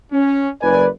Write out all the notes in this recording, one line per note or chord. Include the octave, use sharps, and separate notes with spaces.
C#4
F#1 B4 D5 G#5